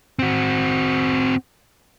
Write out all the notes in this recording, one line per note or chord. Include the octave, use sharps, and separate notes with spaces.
C4 F#4